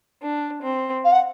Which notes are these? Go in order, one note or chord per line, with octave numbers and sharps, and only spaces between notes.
D4
C4
F5
F#5